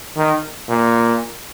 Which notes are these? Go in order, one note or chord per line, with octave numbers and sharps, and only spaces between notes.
D#3
A#2